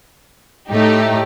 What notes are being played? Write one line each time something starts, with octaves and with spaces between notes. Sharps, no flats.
A2 A3 D#4 G4